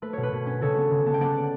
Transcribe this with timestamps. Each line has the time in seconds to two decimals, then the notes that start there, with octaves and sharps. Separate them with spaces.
0.02 A3 B4
0.13 B2 C#5
0.23 B4
0.32 B2
0.46 C#4
0.61 C#3 A4 C#5
0.76 B3
0.91 C#3
1.06 B3 A5
1.14 G5
1.21 B3 D5 F#5